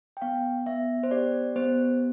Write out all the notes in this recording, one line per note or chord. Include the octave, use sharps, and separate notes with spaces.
G5
B3 F5
B3 E5
C5
G4 D5
B3 C5